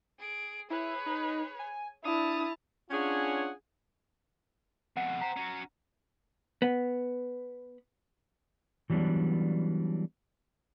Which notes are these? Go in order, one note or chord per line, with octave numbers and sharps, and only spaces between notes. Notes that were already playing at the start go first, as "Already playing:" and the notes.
G#4 D7
E4 G#4 B4 C#5
D#4
G#5
D4 E4 A5 D#6 F7
C#4 D4 F4 G#4 C#5 F#5
F2 B2 F#5
G4 C5 A#5
C#4 F#4
B3
E3 F#3 G3 B3 C#4 D4